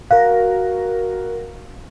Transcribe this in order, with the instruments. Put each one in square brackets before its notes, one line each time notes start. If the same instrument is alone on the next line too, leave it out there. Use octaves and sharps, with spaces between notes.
[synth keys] F#4 A#4 [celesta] F5